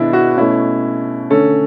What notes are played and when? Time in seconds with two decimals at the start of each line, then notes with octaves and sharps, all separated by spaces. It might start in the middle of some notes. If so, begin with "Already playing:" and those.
Already playing: B2 G#3 B3 D4 E4
0.13 F#4
0.37 B2 A3 C#4 E4
1.30 D3 A3 C#4 A4